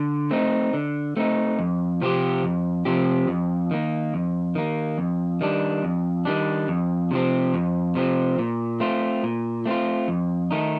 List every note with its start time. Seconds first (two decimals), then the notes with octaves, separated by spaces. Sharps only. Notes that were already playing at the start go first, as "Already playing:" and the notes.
Already playing: D3
0.31 A3 C4 D#4
0.73 D3
1.17 A3 C4 D#4
1.59 F2
2.01 C3 F3 C4 G4
2.44 F2
2.85 C3 F3 C4 G4
3.28 F2
3.71 D#3 A#3
4.14 F2
4.55 D#3 A#3
4.98 F2
5.41 D#3 G3 D4
5.84 F2
6.25 D#3 G3 D4
6.68 F2
7.11 C3 F3 C4
7.54 F2
7.95 C3 F3 C4
8.39 A#2
8.80 A3 C4 F4
9.24 A#2
9.66 A3 C4 F4
10.08 F2
10.51 D#3 A3 D#4